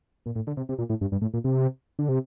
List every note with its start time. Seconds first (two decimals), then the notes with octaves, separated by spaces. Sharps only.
0.26 A#2
0.35 A2
0.47 D3
0.57 C3
0.69 C3
0.78 A#2
0.90 A2
1.01 G2
1.12 G2
1.22 A2
1.34 A#2
1.44 C3
1.99 D3
2.09 C3